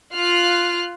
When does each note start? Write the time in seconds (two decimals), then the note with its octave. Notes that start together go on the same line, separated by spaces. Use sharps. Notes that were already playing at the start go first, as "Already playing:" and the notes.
0.13 F4 F6 F#6